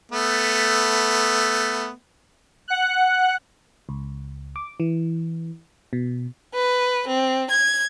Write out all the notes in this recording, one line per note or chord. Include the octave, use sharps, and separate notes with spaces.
A3 B3
F#5 F#6
C#2
D6
E3
B2
B4
C4
G#6